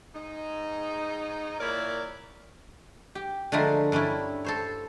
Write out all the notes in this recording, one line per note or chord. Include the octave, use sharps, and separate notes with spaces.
G#2 D#4
A#2 E4 A#4 C#5 D5
G4
D3 F3 G#3 A3 A#4 C5
G2 C#4 D4 E4
A4 C5 C#5